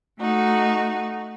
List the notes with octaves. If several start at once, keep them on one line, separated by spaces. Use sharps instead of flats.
A3 D#4 F#4